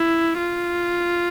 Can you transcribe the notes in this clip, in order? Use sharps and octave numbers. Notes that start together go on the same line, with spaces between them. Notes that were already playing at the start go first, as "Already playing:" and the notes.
Already playing: E4
F4